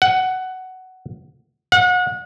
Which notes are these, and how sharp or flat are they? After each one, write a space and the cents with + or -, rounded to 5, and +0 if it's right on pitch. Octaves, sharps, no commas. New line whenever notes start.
F#5 +10
F#5 -35